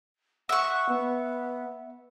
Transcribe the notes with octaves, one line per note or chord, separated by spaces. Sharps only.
E5 F#5 C#6
B3